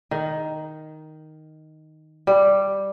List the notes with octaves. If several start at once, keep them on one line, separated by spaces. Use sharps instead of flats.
D#3
G3